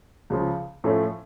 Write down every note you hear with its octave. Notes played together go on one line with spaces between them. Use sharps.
C#2 C#3 F3
A2 F3 A3 C#4